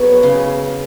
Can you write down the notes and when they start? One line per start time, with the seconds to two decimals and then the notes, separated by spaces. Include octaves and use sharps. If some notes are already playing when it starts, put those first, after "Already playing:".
Already playing: F#3 B3 G#4 B4 C#5
0.23 C#3